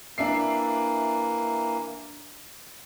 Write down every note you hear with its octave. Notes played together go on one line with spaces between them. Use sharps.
E3 A#3 D4 E5 C7